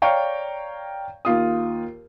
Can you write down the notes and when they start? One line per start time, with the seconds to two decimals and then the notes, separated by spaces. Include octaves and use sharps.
0.02 C#5 D5 F5 G5 A#5 C#6
1.25 D#2 F4 D#6